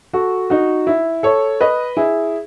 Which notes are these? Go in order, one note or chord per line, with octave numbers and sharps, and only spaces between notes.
F#4 A4
D#4 F#4
E4
A4 C#5
B4 D#5
E4 G#4